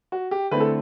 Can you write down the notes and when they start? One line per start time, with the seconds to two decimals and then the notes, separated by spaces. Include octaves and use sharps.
0.12 F#4
0.31 G4
0.51 D3 A3 C4 E4 B4
0.60 A4